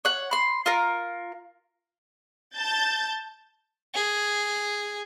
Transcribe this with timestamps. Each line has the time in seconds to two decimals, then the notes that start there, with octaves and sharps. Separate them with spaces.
0.05 C#5 F#5
0.31 B5 C6
0.66 F4 A#4
2.55 A5 G6 A6
3.94 G#4